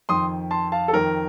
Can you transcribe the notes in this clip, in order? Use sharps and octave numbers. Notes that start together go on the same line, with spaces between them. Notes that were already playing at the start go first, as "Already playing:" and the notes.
F2 D#3 C6 D#6
A5 C6
F5 A5
A4
F2 D#3 A#4